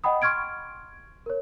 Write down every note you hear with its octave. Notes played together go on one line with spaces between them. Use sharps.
D#5 F#5 G5 B5 D#6
C6 C#6 F6 G#6 D7
A#4 C#5